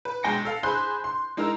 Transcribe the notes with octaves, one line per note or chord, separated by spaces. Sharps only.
B4
B1 G#3 G5 A#6 C#7
A4 F5
G#4 C5 B5 C6 F#6 G6
C6
G#3 D#4 E4 A#4 A#5 E6